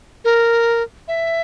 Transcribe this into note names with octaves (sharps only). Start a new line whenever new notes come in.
A#4
E5